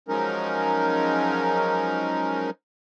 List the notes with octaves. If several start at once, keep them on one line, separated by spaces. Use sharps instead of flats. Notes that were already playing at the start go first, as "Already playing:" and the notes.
F3 F#3 G#3 C#4 D#4 A#4